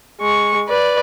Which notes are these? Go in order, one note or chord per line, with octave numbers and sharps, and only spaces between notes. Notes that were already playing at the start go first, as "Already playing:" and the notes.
G#3 C#6
B4 D5